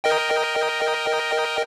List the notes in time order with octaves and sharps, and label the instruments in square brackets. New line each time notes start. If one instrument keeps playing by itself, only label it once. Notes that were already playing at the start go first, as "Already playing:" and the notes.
[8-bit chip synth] A#4 D#5 G5